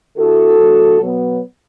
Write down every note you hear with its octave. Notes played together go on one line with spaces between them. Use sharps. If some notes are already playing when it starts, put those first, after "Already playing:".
D3 A3 E4 F#4 A4
E2 D3 F#3 A3
B2 F#3 B3